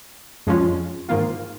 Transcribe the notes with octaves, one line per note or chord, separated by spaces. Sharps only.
F2 F3 G#3 C#4 F4
G#2 D#3 A#3 F4